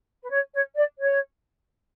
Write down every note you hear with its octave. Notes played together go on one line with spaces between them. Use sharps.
B4
C#5
C#5
D5
C#5